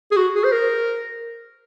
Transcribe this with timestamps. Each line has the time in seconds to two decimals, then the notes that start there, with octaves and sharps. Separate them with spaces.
0.11 G#4
0.16 F#4
0.35 G#4
0.44 C5
0.52 A#4